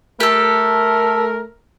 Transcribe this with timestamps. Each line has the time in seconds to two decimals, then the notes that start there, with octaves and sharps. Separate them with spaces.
0.20 A3 G4 A4 A#4